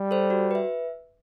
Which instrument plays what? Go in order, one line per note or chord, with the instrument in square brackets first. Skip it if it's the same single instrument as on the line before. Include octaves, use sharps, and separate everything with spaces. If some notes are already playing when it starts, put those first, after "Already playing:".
Already playing: [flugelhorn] G3
[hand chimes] A4 C5
F#4
B4 E5